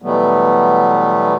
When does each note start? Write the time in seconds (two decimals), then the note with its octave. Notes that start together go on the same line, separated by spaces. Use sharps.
0.02 B2 E3 F#3 G3 A3 B3